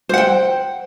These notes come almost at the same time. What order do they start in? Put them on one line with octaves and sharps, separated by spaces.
C5 F#5 G5